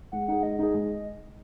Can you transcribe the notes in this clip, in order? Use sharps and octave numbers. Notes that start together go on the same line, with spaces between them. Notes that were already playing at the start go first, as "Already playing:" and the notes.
G#3 F#5
D#4 G#4 F#5
G#3 D#5
D#4 G#4 D#5
G#3